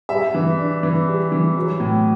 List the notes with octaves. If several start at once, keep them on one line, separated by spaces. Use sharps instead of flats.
G3 E5
E3
D4
E3
G3
E3
F#3
A2